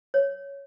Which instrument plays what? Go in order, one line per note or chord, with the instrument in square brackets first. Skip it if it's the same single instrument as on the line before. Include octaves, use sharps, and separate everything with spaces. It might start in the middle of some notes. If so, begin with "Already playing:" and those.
[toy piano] C#5